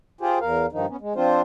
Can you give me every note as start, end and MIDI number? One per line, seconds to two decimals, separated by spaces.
0.21 0.39 65
0.21 0.39 67
0.21 0.39 68
0.21 0.39 72
0.41 0.66 40
0.41 0.66 70
0.41 0.66 77
0.72 0.86 43
0.72 0.86 51
0.72 0.86 53
0.72 0.86 63
0.89 0.96 59
0.89 0.96 61
1.01 1.13 56
1.15 1.42 53
1.15 1.42 60
1.15 1.42 62
1.15 1.42 65
1.15 1.42 72